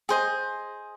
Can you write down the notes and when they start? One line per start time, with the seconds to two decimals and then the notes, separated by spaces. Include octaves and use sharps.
0.09 G#4 C5 D#5